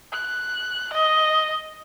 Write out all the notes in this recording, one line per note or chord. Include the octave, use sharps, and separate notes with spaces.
F#6
D#5